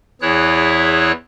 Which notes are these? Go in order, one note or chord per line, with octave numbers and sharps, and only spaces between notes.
E2 E3 E4 G#4 C#5 F#6